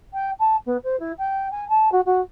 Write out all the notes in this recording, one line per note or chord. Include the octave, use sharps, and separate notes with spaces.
G5
A5
B3
C5
E4
G5
G#5
A5
F#4
F#4